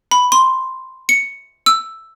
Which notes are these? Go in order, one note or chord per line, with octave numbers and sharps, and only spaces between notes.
B5
C6
C#7
E6